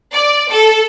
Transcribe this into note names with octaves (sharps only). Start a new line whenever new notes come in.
D5
A4